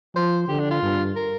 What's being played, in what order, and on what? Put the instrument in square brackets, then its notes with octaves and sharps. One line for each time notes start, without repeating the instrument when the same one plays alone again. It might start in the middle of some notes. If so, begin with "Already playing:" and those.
[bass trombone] F3 [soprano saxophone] C5
[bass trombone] D3 [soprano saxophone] G4
[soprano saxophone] D4
F4
[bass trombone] G2
[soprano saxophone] A#4